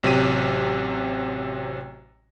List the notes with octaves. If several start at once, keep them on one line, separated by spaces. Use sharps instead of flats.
A1 C3 F#3 G4 D#7